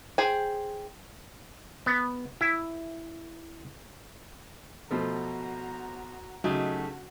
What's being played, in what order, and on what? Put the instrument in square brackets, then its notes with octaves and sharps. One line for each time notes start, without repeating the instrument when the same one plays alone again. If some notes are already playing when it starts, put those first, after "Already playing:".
[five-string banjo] G#4 C5 G5 G#5
[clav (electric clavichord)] B3
E4
[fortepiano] B2 F3 A3 [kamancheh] F#4 A#5
[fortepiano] C#3 F#3 [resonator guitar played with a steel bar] A3 D#4 G4 [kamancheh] F#4